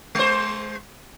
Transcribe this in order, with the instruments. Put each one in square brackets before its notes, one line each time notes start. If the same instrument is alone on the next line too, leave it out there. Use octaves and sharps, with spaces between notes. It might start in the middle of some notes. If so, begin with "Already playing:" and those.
[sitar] G#3 C5